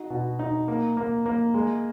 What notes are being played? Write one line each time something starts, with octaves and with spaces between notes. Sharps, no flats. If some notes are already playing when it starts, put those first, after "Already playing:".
Already playing: D#4 F#4
B2
D#4
A#3
A#3
A#3
G#3